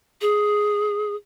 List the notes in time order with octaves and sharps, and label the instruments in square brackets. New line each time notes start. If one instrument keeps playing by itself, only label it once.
[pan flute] G#4